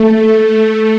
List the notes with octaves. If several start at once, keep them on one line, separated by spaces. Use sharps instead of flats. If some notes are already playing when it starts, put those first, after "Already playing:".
Already playing: A3
A3